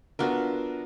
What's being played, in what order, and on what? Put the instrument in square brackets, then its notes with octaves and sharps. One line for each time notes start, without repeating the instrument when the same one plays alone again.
[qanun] B3 D4 E5 [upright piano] F4 F#4 A#4